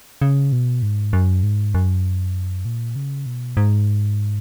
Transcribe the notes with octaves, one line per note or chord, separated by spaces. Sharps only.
C#3
B2
G#2
F#2
G#2
F#2
A#2
C#3
B2
G#2